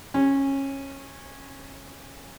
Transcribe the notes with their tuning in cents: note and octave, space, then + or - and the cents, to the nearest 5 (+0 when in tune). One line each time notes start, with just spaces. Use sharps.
C#4 -20